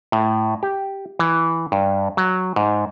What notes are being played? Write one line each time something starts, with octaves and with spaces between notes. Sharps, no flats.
A2
G4
E3
G2
F#3
G#2